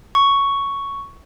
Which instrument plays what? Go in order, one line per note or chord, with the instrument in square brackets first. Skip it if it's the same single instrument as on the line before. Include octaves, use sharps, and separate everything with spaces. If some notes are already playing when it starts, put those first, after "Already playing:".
[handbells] C#6